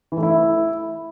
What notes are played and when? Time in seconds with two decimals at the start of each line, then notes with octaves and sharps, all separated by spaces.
0.12 E3
0.17 A3
0.23 E4